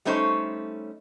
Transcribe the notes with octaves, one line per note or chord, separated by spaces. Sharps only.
G3 A3 C#4 D#4 C5 C#5